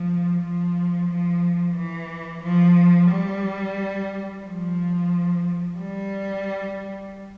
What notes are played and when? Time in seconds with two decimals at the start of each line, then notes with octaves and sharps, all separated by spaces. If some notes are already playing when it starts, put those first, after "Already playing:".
Already playing: F3
0.42 F3
1.09 F3
1.76 E3
2.43 F3
3.10 G3
4.45 F3
5.78 G3